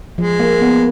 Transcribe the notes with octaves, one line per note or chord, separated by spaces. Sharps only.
F3 G#3
A#3
B3